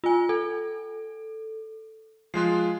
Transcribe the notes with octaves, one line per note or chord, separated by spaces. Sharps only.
F4 G#5
A4
F3 G#3 F4 F#6 C7